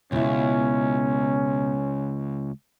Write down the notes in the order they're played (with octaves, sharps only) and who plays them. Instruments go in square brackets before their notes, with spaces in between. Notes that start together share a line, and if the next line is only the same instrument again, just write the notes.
[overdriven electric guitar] C#2 [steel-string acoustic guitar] B2 E4 [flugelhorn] C#4